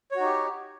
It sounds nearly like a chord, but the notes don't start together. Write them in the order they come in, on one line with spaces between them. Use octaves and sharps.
C#5 F#4 D#4 G4